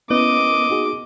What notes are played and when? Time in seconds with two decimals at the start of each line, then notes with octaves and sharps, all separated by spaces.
0.11 B3 C#4 E4 B4 D#5 D6
0.70 D#4 F#4 G#4